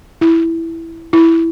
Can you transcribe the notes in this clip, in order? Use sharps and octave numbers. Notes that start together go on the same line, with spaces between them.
E4
E4